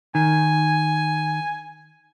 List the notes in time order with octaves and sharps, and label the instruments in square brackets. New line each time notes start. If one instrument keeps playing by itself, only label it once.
[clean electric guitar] D#3 [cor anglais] G#5